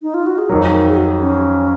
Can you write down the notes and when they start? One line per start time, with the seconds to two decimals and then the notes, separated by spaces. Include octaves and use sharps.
0.02 D#4
0.14 F4
0.26 F#4
0.38 G#4
0.50 F2 D#3 F#3 A#4
0.73 A#4
0.88 G#4
0.97 F#4
1.21 C#4